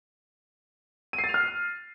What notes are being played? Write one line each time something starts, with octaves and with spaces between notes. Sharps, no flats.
D#7
C7
A6
F7
F6